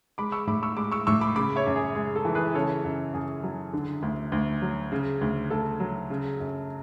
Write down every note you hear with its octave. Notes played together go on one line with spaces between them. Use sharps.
G#3 B5 D6
C#6 E6
A2 B5 D6
C#6 E6
G#3 B5 D6
C#6 E6
A2 C#6 E6
B5 D6
C#3 B5 D6
C#5 E5
F#2
G#4
G#3 G#4
A4
E3
G#4 B4
C#3 A4 C#5
F#2
F#2 G#4
F#3
D3
D2
D2
F#3
C#3
D2
D2 A4
F#3
C#3
F#2